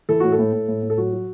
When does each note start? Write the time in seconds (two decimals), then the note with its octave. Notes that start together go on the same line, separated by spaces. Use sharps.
0.09 E3 A4
0.20 A2 F#4
0.32 A4
0.39 A2
0.53 A2
0.68 A2
0.83 A2
0.90 A4
0.98 F#3 F#4
1.13 F#3